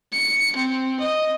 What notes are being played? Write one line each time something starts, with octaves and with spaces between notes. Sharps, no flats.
C#7
C4
D#5